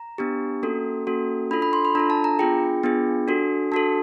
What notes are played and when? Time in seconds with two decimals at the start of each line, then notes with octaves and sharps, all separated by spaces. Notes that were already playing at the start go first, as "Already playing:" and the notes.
Already playing: A#5
0.18 B3 D4 G4
0.63 A#3 C#4 F#4 A4
1.07 A#3 C#4 F#4 A4
1.51 D4 F4 A4 B5
1.62 B5
1.73 C6
1.85 B5
1.95 D4 F4 A4 A#5
2.10 A5
2.24 A#5
2.39 B3 D4 F4 G#4 G5
2.83 B3 D4 F4 G#4
3.28 D4 F#4 A4
3.72 D4 F#4 A4 A5